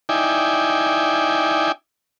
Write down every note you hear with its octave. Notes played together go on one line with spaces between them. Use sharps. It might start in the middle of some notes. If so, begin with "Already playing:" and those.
D#4 E4 D5 G5 G#5